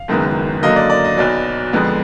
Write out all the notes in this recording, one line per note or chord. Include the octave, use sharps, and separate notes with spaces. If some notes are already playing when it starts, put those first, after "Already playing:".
Already playing: F5
F#1 F#2 D#3 G#3 B3
F#2 D3 F#3 A#3 D#5
D5
D5
D#5
B1 B2 F#3 D5
F2 D3 G#3 B3